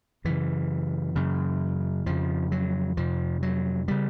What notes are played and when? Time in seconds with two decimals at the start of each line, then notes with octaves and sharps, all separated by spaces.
0.25 F#2 C#3 E3
1.16 F#2 C#3
2.06 F2 C#3 F3
2.52 F#3
2.97 F2 C3 F3
3.43 F#3
3.88 C#3 G3